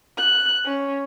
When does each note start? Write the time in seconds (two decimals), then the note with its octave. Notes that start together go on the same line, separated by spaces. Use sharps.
0.18 F#6
0.66 C#4